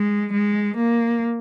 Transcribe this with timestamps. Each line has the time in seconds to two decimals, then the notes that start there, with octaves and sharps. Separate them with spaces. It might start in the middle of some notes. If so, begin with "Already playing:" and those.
Already playing: G#3
0.33 G#3
0.77 A#3